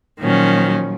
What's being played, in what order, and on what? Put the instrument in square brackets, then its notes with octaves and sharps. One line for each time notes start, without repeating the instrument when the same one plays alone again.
[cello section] A#2 F3 F#3 [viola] D#3 C#4